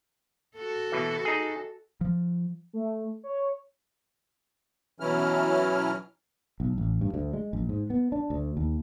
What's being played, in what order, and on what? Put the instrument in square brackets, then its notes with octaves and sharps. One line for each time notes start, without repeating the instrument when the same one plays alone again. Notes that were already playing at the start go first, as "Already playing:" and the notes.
[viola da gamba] F#4 A4
[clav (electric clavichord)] B2 E3
D#4 G#4
[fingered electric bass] F3
[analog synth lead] A3
C#5
[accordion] B2 E3 F#3 C#4 E4 F6
[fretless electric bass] B1
A1
G2
D2
G#3
A#1
G#2
B3
D4
D2
D#2